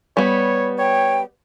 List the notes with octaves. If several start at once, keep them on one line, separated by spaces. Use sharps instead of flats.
G3 B3 C#5
C#5 G5